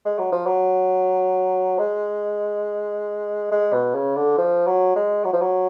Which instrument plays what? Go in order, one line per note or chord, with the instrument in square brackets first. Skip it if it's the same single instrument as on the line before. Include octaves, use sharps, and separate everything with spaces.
[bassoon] G#3
F#3
F3
F#3
G#3
G#3
B2
C#3
D3
F3
F#3
G#3
F#3
F3
F#3